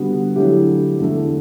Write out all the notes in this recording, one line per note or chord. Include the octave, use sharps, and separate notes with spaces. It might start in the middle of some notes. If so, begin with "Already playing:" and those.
Already playing: D3 G3 B3 F#4
D3 F#3 A3 E4 G4
E2 D3 A3 E4